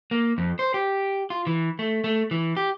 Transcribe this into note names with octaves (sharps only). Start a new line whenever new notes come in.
A#3
F2
C5
G4
F4
E3
A3
A3
E3
G4